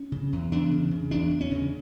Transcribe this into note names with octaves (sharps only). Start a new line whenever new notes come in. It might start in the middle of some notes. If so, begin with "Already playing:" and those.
Already playing: C#4
C#3
E2
E2 D4
C#3
C#3
E2 D4
E2
C#4
C#3